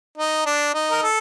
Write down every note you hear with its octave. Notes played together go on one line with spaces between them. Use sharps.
D#4
D4
D#4
A#4
A4